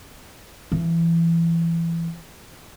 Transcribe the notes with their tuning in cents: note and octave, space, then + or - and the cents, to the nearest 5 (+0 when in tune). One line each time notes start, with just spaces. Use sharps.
E3 +20